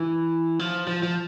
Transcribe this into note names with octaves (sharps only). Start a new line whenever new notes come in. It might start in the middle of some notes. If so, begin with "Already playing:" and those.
Already playing: E3
F3
F3
F3